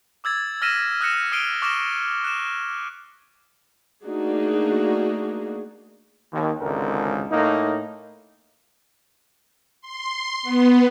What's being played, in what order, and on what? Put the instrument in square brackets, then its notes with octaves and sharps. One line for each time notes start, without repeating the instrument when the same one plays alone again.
[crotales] D6 E6 G#6 A6
E6 F6 A#6 B6 D#7 E7
D#6 F#6 A#6 C#7 E7
D#6 F6 C7 D7 D#7 G7
C#6 D6 F6 A#6 E7 G7
F#6 E7
[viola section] A3 A#3 D4 D#4 F#4 G#4
[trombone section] D#2
G#1 C#2 D3 A#4
A2 A#3 D#4
[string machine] C6
B3